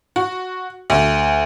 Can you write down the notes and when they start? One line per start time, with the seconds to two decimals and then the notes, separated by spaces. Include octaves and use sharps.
0.16 F#4
0.90 D2